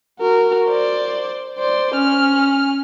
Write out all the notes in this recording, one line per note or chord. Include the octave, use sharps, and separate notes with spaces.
F#4 A#4
C5 D5
C5 D5
C#4 F6